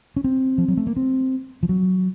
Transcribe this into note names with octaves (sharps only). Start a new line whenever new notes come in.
C#4
C4
F3
F#3
A3
A#3
C4
F3
F#3